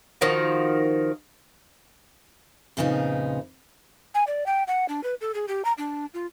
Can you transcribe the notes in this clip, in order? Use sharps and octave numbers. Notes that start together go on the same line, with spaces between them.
D#3 F3 F#4
F2 A#2 C#3 B3 D#4
G#5
D5
G5
F#5
D4
B4
A4
G#4
G4
A#5
D4
F4